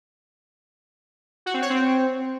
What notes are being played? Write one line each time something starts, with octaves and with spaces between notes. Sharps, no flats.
F#4
C4
C#5
C4